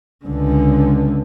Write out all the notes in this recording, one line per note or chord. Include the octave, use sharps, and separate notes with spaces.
C#2 D3